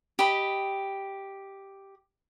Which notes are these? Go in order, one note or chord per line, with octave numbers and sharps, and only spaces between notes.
G4 D#5 B5